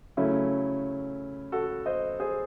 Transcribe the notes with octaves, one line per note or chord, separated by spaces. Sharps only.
C#3 F#3 A3 C#4 E4
F#4 A4
C5 D#5
G#4 C5